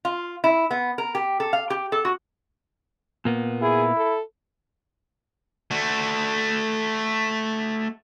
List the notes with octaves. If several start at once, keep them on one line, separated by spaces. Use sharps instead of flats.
F4
E4
B3
A#4
G4
A4
F5
G4
A4
F#4
A#2 A#3 B3
E4 G#4
A4
A3 F#4